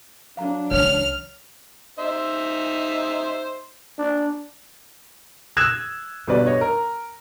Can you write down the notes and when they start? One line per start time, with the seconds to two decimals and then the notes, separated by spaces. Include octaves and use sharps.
0.37 F#3 D4 F5 A#5
0.71 C#2 E3 C#5 F6 F7
1.99 D#4 C5 E5
3.99 D4
5.57 D#6 E6 F#6 G#6 E7
6.27 G1 B2 G3 B4 D5
6.47 C#5 D#5
6.61 A#4